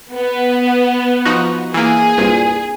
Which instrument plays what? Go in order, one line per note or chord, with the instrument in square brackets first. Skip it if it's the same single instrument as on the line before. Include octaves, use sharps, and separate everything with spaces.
[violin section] B3
[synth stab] F3 D#4 F#4
[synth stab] E3 A#3 [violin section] G#4
[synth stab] C2 G2 A#2